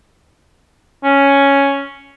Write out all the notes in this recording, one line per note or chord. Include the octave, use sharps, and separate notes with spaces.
C#4